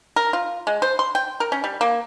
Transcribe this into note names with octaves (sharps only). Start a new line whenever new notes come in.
A#4
F4
G#3
C5
C6
G5
A#4
C#4
G3
A#3